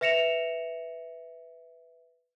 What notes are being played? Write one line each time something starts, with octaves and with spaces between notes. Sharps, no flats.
B4 E5 A#6 C#7 E7 F7